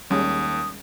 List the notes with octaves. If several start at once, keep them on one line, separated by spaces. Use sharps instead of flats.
D#2 G3 G#3 C#4 D#6